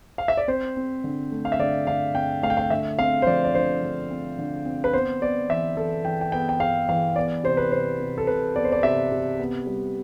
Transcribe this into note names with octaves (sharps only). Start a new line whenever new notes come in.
F5
E5
D5
C4 C5
C4
D3
A3
F5
E5
D3 D5
D3 F5
C4 G5
A3 F5
G5
F5
D3 E5
C4 F5
C5
F3 D5
D5
D3 C5
D3
C4
D3
C4
B4
B3 C5
B3 D5
E3 E5
E3 A4
E3 G5
G5
B3 G5
G5
B3 F5
E3 F5
B3 D5
C3 C5
B4
C3 C5
C3
A4
C3 B4
B3 D5
C5
D5
C3 E5
C3
B3
G3